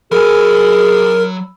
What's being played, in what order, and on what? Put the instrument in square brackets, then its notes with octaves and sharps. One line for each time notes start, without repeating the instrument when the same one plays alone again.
[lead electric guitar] F#3 G#5 [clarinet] G#4 [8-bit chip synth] A#4 [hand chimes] B5 E6